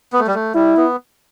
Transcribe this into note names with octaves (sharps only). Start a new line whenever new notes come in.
B3
A3
G3
A3
G3 E4
B3